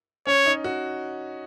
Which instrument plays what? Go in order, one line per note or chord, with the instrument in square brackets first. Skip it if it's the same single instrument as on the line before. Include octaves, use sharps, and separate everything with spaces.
[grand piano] C#4 [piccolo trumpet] C#5
[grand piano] D#4
F#4